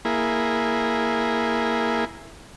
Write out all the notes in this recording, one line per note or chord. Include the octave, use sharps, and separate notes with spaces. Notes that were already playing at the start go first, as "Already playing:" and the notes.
A#3 E4 G#4